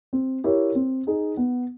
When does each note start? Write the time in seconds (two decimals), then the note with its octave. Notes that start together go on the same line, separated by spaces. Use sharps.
0.13 C4
0.44 E4 G4 A#4 C#5
0.75 C4
1.07 D#4 G#4
1.37 B3